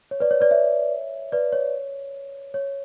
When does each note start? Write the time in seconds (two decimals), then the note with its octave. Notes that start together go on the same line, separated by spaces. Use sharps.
0.11 C#5
0.20 B4 D5
0.31 C#5
0.41 B4 D5
0.51 C#5 E5
1.32 B4 D5
1.53 C#5
2.54 C#5